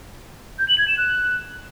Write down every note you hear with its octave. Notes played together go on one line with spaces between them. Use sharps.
G6
F#7
G#6
E7
F#6